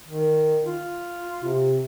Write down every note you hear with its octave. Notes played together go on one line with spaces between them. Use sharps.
D#3
F4
C3